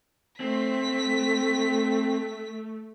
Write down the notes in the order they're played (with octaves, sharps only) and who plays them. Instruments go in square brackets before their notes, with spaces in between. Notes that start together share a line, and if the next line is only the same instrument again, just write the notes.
[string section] A3 [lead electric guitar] C4 [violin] B6